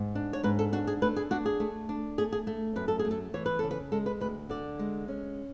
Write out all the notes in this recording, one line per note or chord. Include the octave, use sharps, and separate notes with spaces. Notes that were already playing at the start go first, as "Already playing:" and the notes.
Already playing: G#2
D4
C#5
G#2 B4
A4
D4 F#4
G#4
A3 B4
G#4
D4 F#4
G#4
A3
D4
A3 G#4
G#4
A3
F#2 B4
A4
G#4
A3
A4
E3 C#5
B4
C#3 A4
B4
G#3 A4
B4
D2 B4
D3 D5
G#3
C#4